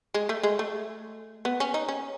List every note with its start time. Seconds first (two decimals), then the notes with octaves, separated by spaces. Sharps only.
0.14 G#3
0.29 A3
0.43 G#3
0.59 A3
1.45 B3
1.60 C#4
1.74 D#4
1.89 C#4